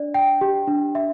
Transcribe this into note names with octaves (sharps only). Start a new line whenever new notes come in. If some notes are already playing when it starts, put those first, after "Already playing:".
Already playing: D4 D5
G5
G4
D4
E5